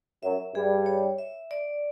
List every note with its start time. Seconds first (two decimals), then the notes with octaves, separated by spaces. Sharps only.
0.23 F#2 F#3 E5
0.54 G2 G3 G#4
0.86 C#5
1.19 E5
1.51 D5